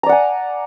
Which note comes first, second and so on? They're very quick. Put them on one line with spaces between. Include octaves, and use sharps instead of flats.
A#5 D5 F#5 G#5